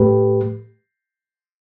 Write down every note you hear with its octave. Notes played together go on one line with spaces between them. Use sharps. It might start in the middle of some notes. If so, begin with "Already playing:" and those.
Already playing: A2 A3 G4 B4